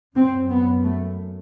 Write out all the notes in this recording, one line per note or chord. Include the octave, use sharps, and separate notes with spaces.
F#2 C4
B3
A3